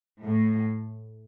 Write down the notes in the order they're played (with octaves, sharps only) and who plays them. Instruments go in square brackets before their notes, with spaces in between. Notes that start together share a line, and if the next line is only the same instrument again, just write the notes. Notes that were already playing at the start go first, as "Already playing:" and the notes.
[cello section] A2